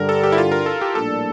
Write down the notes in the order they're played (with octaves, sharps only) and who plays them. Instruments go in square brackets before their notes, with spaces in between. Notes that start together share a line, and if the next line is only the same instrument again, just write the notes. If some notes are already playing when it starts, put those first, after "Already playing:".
Already playing: [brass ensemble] G2 D3 G3 [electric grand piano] A#4
[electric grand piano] A4
G4
E4
F4
A#4
A4
G4
[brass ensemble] A#1 A2 G3 A#3 D4 [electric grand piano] A4